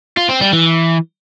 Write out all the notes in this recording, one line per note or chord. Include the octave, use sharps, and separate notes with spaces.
F4
C4
G3
E3